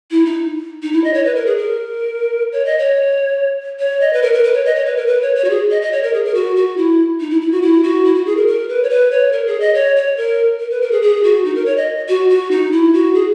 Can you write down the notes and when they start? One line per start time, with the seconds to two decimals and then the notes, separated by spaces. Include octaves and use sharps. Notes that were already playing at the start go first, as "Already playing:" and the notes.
0.11 E4
0.25 D#4
0.83 D#4
0.93 E4
1.04 D#5
1.14 C#5
1.25 B4
1.35 A#4
1.46 G#4
1.57 A#4
2.52 C#5
2.65 D#5
2.78 C#5
3.79 C#5
4.01 D#5
4.13 B4
4.22 A#4
4.33 A#4
4.44 B4
4.54 C#5
4.65 D#5
4.75 C#5
4.86 B4
4.96 A#4
5.07 B4
5.22 C#5
5.36 C#5
5.45 F#4
5.50 G#4
5.71 D#5
5.82 D#5
5.92 C#5
6.03 A#4
6.14 G#4
6.25 A#4
6.35 F#4
6.56 F#4
6.77 E4
7.20 D#4
7.30 E4
7.41 E4
7.52 F#4
7.62 E4
7.83 F#4
8.05 E4
8.15 F#4
8.26 G#4
8.37 A#4
8.47 A#4
8.69 B4
8.83 C#5
8.90 B4
9.11 C#5
9.32 A#4
9.47 G#4
9.60 D#5
9.74 C#5
9.96 C#5
10.17 A#4
10.60 A#4
10.71 B4
10.82 A#4
10.92 G#4
11.02 G#4
11.24 F#4
11.45 D#4
11.55 A#4
11.66 C#5
11.77 D#5
12.09 F#4
12.30 F#4
12.51 D#4
12.72 E4
12.93 F#4
13.14 G#4